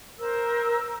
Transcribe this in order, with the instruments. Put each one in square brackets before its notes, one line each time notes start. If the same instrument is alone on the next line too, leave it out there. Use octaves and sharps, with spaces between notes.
[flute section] A#4 C5 E6